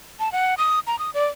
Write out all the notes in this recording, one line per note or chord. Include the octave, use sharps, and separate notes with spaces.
A5
F#5
D#6
A#5
D#6
D5